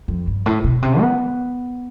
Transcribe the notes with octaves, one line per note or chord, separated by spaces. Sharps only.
F2
G2
A2
B2
C3
B3